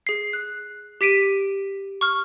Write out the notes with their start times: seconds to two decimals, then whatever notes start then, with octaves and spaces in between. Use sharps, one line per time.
0.07 G#4 C7
0.33 F#6
1.01 G4 B6 D7 D#7
2.01 C#6 F6